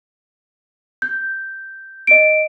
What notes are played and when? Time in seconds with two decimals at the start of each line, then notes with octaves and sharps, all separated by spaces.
1.02 G6
2.07 D#5 D7